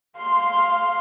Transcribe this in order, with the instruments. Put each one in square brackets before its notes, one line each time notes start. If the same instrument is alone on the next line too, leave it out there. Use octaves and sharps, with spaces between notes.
[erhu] F5 [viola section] C6